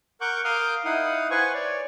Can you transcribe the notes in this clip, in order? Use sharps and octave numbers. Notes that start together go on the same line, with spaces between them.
A#4 F#5 C#6 D6 F#6 G6
A#4 F5 D6 D#6 F6 G6
D#4 E4 F5 F#5 D#6
B4 C5 F#5 G#5 C#6
C#5 D5